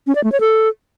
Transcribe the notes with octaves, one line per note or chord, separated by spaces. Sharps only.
C#4
D5
A3
C#5
A4